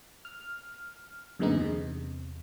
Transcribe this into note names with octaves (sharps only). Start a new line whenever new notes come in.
F6
F#2 A#2 D3 G#3 B3 D#4
E2 C3